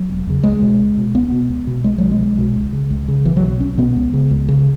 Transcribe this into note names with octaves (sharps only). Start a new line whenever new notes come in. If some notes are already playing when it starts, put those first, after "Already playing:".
Already playing: F#3
E1
E2 C#3
C#2 G#3
B2
C#2
B2
C#2 B3
B2
C#2
B2
B1 G#3
B2 F#3
G#3
B1
B2
C#2
C#3
C#2
C#3
B1 E3
F#3
B2
B1 C#4
B2 B3
C#2
C#3
C#2
C#3